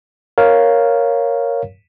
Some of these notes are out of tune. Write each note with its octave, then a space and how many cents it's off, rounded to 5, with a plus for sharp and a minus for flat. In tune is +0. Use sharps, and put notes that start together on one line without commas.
A#4 +0 C#5 +0 F5 +0